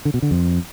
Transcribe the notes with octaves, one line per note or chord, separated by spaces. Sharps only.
D3
B2
D3
F2